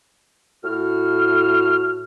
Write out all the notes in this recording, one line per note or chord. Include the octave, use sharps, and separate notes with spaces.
A2 F#4 F6